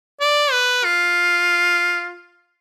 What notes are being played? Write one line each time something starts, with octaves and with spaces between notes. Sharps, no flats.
D5
B4
F4